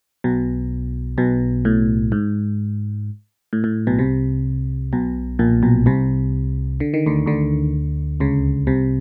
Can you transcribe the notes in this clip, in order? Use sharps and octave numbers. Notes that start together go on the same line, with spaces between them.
B1 B2
B1 B2
A2
G#2
A2
A2
B1 B2
C2 C3
B1 B2
A#1 A#2
B1 B2
C2 C3
D3
D#3
D2 D3
D2 D3
C#2 C#3
C2 C3